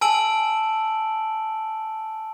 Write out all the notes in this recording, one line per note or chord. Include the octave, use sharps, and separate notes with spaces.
G#5 A5 E6 D7 F#7